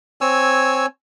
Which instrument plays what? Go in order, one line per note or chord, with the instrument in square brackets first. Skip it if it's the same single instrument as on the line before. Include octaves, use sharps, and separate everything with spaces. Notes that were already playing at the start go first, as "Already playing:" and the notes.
[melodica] C4 C#5 G#5 E6